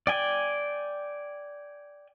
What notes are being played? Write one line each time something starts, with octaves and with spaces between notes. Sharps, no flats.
D5 G5 G#5